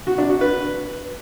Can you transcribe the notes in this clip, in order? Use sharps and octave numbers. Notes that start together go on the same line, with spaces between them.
F#4
D4
F#4
B4